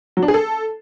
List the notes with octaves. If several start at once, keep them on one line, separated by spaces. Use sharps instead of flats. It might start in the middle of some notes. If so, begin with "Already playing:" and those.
F#3
D4
G#4
A4